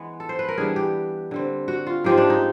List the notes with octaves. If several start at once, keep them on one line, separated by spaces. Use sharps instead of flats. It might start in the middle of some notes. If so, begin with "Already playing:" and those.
Already playing: E3 G#3 B3
A4
C5
B4
A#4
E3 G3 B3 D4 G#4
G4
D3 G3 C4
F#4
F4
G#2 F3 G#3 G4
D4
D#4